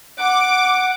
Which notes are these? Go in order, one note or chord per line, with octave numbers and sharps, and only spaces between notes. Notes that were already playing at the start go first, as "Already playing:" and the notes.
F#5 D6